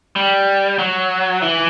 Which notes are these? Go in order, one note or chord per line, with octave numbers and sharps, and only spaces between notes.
G3
F#3
E3